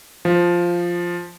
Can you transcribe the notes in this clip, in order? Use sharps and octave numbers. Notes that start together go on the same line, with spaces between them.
F3